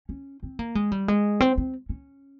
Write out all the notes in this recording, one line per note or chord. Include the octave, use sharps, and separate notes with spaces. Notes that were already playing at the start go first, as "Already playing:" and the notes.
C#4
C4
A#3
G#3
G3
G#3
C4
C4
C#4